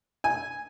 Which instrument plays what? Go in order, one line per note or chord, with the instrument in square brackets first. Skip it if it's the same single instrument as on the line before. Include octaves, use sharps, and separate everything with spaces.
[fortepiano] G#5